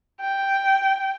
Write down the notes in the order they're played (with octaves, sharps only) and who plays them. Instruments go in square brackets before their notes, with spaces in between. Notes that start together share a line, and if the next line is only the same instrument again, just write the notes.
[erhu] G5